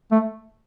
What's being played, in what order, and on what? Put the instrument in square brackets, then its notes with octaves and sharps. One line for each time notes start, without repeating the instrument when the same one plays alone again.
[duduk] A3